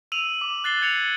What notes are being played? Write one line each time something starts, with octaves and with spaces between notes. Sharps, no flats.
E6 D#7 F7 F#7
D6
F#6 A6 C7 G7
G#6 C#7 F7 F#7